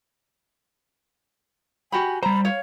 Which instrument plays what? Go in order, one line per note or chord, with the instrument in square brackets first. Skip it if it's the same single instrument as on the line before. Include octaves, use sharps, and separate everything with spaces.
[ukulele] F#4 G4 B5 [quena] G#5
[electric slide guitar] G3 C5 [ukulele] A#5 [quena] B5
[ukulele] C#5 [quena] F5